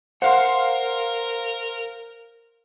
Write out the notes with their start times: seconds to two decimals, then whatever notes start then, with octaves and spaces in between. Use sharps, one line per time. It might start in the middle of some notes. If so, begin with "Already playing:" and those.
0.22 A#4 C5 F5 F#5 C6